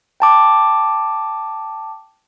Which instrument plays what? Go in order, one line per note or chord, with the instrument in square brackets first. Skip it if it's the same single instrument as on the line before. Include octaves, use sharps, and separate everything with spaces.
[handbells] G5 A5 D6